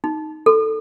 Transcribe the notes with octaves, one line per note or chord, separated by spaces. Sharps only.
D#4
A4